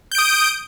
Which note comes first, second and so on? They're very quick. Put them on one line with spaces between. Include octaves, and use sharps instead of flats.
G6 D7 D#6